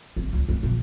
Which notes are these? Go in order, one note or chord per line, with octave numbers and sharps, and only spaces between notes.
G#1
C#2
C#2
A#1